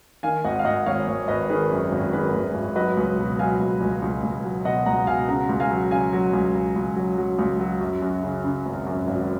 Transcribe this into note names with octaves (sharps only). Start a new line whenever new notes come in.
D#3 F5 G#5
G#1 D#5 F#5
F5
G#1 D#5 F#5
G#1 C#5 F5
G#1
G#1 B4 D#5
D#3 G#4 B4
F#2
G#1
D#3 G#4 B4
G#1
G#1
F#3 B4 D#5
C#2
B2
F#3 F5 G#5
C#2
C#2
C#2
C#2
F#3
B2 D#5 F#5
C#2 F#5 A#5
B2 F5 G#5
C#3 F#5 A#5
C#2
F5 G#5
F#3
C#3 F5 G#5
F#3
C#2
C#2
C#2
F#3
F#3
C#2
F#3
F#2
F#2
C#3
C#3
G#1
F#2
G#1